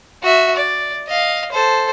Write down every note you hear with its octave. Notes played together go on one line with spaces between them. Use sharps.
F#4 E5
D5
D#5 F5
A4 C5